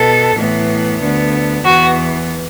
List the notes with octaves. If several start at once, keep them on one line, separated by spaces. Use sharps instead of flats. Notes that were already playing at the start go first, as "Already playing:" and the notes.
Already playing: B2 B3 A4
A2 E3 B3
D2 D3 B3
E2 E3 B3 F#4